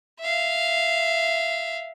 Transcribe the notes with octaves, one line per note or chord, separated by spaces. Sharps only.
E5 F5